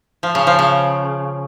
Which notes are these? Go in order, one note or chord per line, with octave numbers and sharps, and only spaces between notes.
F3
C#3
F3
C#3